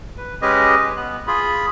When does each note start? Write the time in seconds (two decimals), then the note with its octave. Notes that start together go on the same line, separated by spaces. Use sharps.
0.17 B4
0.42 G#3 C#4 G4 G#4 B4 D#5
0.97 B3 F#6
1.27 F4 G#4 B5